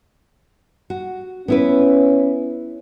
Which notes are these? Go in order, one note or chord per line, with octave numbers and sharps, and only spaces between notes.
F#4
B3 C#4 E4 B4